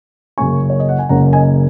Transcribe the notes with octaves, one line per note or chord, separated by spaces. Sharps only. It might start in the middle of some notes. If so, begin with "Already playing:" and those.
F#1 F#2 C#3 A#3 C#4 G#5 C#6
C#5
D#5
F#5
G#5
F#1 F#2 C#3 A#3 C#4 F#5 A#5
D#5 G#5